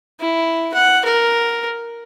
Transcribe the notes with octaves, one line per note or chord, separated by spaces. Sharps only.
E4
F#5
A#4